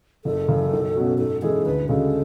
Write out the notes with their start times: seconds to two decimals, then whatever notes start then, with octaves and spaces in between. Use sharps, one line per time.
0.25 F#1 A4
0.48 F#2 C#3 E3
0.72 B1
0.95 B2 F#3 C#4 F#4
1.18 G#2 A4
1.42 E3 G#3 C#4 G#4 A4
1.65 D2 B4
1.89 C#3 G#3 C#4 F#4 A4